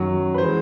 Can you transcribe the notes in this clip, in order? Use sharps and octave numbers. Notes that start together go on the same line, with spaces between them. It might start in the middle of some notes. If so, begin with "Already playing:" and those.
Already playing: F#2 D#3 F#3
B4
E3 G#3 C5